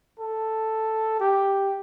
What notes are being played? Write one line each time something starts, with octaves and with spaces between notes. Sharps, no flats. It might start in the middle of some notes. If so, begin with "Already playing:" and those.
A4
G4